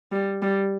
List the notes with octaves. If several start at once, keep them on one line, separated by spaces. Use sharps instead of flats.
G3
G3